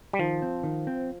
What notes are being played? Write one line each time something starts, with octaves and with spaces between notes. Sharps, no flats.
G3
D#3 F3
C4
D#3
C4